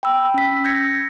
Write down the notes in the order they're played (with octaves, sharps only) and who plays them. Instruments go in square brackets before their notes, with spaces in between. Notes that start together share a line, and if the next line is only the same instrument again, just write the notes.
[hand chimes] G5 B5 E6
C#4 B6
E6 G6 G#6 A#6 C#7